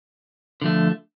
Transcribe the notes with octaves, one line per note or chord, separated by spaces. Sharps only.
D3 F3 A3